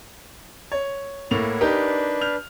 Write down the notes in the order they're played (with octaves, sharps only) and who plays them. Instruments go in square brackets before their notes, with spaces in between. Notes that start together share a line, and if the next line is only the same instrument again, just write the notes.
[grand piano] C#5
[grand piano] A2 A#3 F7 [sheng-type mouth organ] E4 C#5 F#5
[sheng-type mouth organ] D4 B4 [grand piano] D#4 G4 A#4
[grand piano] F6 G6 F7